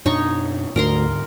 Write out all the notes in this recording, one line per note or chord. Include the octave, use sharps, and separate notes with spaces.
F#2 B2 D4 D#4 C#5 C#6
D2 G#2 D3 A#4 A#5 C6